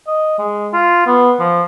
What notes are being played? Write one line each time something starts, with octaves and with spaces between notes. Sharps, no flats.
D#5
G#3
F4
B3
F3